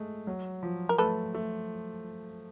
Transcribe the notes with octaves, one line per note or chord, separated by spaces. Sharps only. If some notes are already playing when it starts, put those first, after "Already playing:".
Already playing: G#3 A3
F#3
F3
A#4
A3 A4 B4
A3